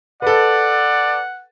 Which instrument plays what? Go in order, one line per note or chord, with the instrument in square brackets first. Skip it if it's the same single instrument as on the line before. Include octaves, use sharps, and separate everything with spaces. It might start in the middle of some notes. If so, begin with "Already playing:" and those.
[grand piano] A4 B4 [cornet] D5 [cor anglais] F#5